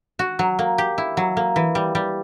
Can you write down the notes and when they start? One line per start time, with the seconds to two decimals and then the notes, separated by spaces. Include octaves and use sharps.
0.19 F#4
0.39 F#3
0.59 A#3
0.78 G4
0.98 E4
1.17 F#3
1.37 A#3
1.56 E3
1.75 G3
1.95 G3